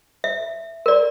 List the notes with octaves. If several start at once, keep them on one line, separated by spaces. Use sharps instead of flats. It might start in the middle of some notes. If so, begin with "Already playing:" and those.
E5
A#4 D5